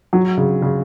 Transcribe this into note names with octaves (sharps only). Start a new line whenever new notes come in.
F#3
C#3
C#3